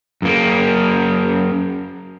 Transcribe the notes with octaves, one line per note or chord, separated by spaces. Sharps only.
F#2 A#3